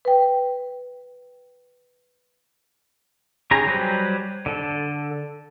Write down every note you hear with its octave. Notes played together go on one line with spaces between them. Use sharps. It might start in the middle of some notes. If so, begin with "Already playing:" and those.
B4 G5
C#4 G4 G#4 A#5
F#3 G3 G4 B4 C5
D3 A4